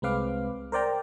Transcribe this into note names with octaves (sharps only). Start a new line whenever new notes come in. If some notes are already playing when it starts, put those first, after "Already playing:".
C2 G#3 C4 B4 F5 D6
A#4 C5 D5 G5 A#5